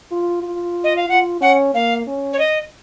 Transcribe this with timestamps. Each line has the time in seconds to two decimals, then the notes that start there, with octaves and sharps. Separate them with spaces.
0.11 F4
0.43 F4
0.84 D#5
0.96 F5
1.09 F4 F#5
1.41 C#4 F#5
1.74 A#3 F5
2.06 C#4
2.33 C#5
2.39 D#5